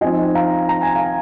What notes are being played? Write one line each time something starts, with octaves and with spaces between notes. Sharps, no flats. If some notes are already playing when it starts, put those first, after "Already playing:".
F3 C4 D#4 D#5 G#5
F5 A#5
A#5
G#5
F5 A#5